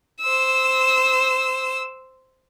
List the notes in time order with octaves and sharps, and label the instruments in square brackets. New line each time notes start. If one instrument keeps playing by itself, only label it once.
[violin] C5 E6